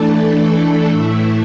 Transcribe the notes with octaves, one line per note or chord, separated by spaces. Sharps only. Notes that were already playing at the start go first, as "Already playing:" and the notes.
Already playing: E3 A3 D4 A4
A2 E3 A3 E4